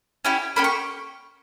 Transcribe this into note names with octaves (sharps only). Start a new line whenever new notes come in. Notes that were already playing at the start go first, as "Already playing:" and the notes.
C#4 E4 G4
A#3 C#4 G4 B5
C#6